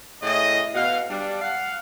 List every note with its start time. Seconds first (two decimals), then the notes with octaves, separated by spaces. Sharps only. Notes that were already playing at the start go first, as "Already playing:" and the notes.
0.23 A2 C#3 E4 G#4 D#5
0.74 B2 F5
1.10 G3 D4
1.41 F5 F#5